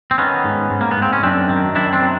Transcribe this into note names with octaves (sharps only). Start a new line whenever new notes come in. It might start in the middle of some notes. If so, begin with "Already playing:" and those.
C4
D#3 B3 C#4
G#2
G#2
A#3
B3
G#2
C4
C#4
F#2 C4 D4
D#3
F#2 D4 E4
C4 D4
D#3